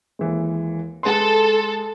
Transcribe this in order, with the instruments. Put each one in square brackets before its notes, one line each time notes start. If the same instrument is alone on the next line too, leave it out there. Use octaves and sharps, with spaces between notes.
[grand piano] D#2 E3 G#3
[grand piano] G#3 B4 C6 [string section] A4